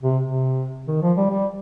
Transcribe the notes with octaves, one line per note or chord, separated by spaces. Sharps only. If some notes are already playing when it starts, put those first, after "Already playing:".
C3
C3
D#3
F3
G3
G3